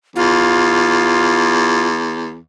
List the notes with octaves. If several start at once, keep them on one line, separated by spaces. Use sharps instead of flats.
E2 F4